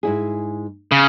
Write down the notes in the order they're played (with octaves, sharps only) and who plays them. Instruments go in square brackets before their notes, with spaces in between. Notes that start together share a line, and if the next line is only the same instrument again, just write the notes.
[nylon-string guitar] G#2 E4 G#4
[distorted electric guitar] C#3